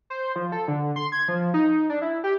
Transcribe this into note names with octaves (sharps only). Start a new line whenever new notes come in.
C5
F3
A4
D3
C6
G#6
F3
D#4
D4
E4
G4